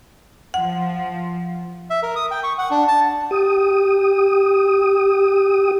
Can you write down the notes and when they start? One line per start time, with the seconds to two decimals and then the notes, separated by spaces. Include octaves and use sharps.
0.54 F3 F#5
1.90 E5
2.03 A#4
2.16 D#6
2.31 G5
2.44 C#6
2.58 F#5
2.71 D4
2.88 A5
3.31 G4 D#6